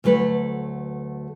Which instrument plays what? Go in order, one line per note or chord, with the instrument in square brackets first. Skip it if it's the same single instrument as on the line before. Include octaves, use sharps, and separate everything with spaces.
[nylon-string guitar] D2 F#3 A3 B4